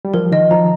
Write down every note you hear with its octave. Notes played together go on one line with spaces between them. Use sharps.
G3
F3 A#4
D#3 D#5
F3 A#5